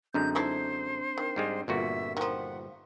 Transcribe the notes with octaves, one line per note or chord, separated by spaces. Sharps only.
F#2 D3 G#3 C4 D4 A#5 G6
D#4 E4 A4 C5
D#3
G#2 G3 G#3
G1 A#2 F#4 E5
D#3 F3 F#5